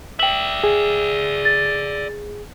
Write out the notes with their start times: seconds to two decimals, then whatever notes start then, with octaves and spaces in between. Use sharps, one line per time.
0.19 D5 E5 G5 F#7
0.64 G#4
1.45 A6